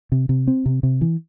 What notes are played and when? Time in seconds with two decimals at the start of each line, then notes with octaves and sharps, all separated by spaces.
0.12 C3
0.29 C3
0.47 C4
0.66 C3
0.83 C3
1.01 E3